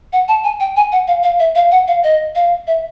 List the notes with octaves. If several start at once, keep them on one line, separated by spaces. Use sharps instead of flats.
F#5
A5
G#5
G5
G#5
F#5
F5
F5
E5
F5
F#5
F5
D#5
F5
E5